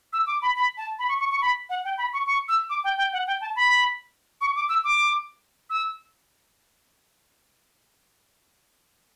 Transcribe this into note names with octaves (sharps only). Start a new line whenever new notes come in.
E6
D6
B5
B5
A5
B5
C#6
C#6
C#6
B5
F#5
G5
B5
C#6
C#6
E6
D6
G5
G5
F#5
G5
A5
B5
C#6
D6
E6
D6
E6